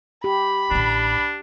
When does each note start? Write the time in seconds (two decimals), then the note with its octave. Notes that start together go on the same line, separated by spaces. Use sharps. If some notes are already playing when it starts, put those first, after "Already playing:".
0.24 G4 B5
0.71 A1 D3 D4